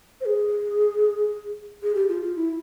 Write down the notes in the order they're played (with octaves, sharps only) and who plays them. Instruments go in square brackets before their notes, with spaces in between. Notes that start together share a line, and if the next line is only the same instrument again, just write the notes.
[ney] C5
G#4
G#4
G4
F4
F4
E4